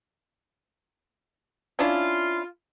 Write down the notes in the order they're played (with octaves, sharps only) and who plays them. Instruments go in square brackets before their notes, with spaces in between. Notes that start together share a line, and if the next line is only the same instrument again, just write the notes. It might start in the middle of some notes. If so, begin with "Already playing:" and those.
[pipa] C#4 D4 E4 [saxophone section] F4